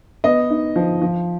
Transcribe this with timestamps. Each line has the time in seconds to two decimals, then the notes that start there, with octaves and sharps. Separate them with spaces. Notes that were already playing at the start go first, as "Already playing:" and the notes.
0.24 B3 D#5
0.50 D#4
0.76 F3
1.02 F3